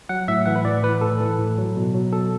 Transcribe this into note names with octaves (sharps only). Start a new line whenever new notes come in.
F#3 F#5
A2 E5
E3 F#5
B4
A2 D5
E3 B4
A2 A4
E3
A2
F#3
B2
F#3
B2 A4